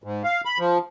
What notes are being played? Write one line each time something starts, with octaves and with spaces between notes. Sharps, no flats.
G#2
F5
B5
F3